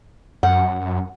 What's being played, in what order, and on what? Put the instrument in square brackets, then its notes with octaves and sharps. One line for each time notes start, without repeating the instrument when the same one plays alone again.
[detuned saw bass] F#2 [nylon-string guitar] F#5